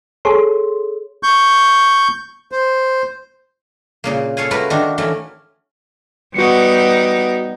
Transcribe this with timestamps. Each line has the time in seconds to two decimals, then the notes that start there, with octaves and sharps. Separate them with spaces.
0.25 G#4 A4 C#5 C6
1.23 C#6 G6
2.52 C5
4.04 A#2 C#3 A#3
4.37 A4 C#5 F5 G#5
4.51 A3 A#3 F4 F#4 A#4 B4
4.70 D#3 D4 F#4 A#4
4.98 E3 A3 C#4 A#4
6.34 G3 B3 D#4 F#4 C#7